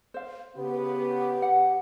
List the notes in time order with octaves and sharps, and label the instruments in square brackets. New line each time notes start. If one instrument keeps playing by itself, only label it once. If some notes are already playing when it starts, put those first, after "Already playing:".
[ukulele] C5 F5
[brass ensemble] C#3 B3 [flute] G4
[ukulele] F#5